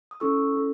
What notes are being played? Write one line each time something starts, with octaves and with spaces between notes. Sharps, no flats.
D#6
C#4 E4 A4 C#6 E6
C#4 E4 A4